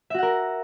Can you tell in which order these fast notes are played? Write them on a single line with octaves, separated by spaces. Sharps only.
E5 F#4 F#5 A#4